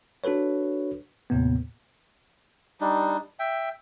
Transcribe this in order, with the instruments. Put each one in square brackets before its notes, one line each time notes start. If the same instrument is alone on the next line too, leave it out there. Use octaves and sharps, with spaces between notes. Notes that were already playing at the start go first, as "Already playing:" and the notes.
[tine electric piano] D4 F#4 A4 B4 C#5
D#2 A2 C3 A#3 B3
[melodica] G3 D4 D#4
E5 G5